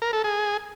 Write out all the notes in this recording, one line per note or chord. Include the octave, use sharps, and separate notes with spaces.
A#4
A4
G#4